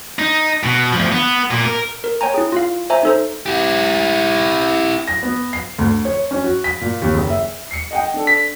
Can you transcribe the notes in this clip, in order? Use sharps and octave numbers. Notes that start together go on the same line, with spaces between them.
D#4
B2
D2 F3
B3
A#2
A#4
A#4
C#5 G5 G#5 A#5
E4 G#4
F4 F5
C5 E5 G#5 A#5
D#4 A4 C5
E4 G4
A#6
B3
C7
D2
C#5
C#4
F#4
B6
A#2
D#2
F#1
E5
C7 C#7
D#5 F#5 G5
D4 A4
B6